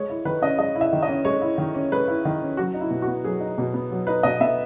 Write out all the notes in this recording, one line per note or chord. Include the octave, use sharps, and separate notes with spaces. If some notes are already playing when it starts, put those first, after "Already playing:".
Already playing: G#3 C#5
E4
D#3 B4
C#4 D#5
G#3 D#5
E4
E5
D#3
D#5
C#4
G#3 C#5
E4
D#3
C#4
G#3 B4
E4
D#3
C#4
F#3 F#4
D#4
E4
B2
B3 F#4
F#3 G#4
D#4
B2
B3
F#3
D#4 B4
B2 D#5
B3 E5